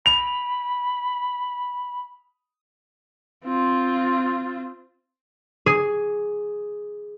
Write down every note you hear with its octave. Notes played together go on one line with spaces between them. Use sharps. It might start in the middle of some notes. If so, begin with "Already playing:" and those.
B5 F7
C4 F4
G#4